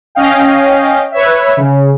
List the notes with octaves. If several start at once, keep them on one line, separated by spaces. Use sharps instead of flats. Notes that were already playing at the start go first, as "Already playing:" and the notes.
C#4 D#5 F5 G5
B4 C#5 E5
C#3